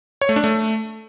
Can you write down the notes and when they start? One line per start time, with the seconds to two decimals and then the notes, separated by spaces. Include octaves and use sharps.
0.21 C#5
0.29 A3
0.36 D4
0.44 A3